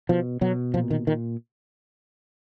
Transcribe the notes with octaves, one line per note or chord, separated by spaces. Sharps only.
B2 F3
B2 F#3
A#2 F3
D#3
A#2 D#3